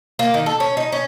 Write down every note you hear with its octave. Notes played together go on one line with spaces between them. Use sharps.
A#3
D#3
A4
C#4
D#4
C#4